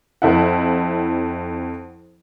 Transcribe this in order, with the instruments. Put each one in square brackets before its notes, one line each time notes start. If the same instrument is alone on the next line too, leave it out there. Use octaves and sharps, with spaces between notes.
[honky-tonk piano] F2 E4 F#5